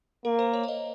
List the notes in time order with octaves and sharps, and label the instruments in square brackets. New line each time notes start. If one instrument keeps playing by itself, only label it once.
[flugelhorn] A#3 [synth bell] A#4
[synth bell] C5
C#5
F5
D#5